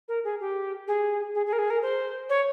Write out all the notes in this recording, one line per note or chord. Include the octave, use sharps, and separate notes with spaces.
A#4
G#4
G4
G#4
G#4
G#4
A#4
G#4
A#4
C5
C#5